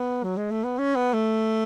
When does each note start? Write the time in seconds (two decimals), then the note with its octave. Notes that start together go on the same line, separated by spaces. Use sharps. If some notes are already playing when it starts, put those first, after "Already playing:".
Already playing: B3
0.23 F#3
0.37 G#3
0.51 A3
0.64 B3
0.79 C#4
0.95 B3
1.13 A3